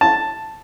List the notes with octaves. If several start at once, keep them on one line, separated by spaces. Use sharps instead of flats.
A5